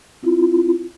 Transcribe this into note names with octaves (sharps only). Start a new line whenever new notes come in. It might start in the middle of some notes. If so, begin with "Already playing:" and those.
C4 E4 F4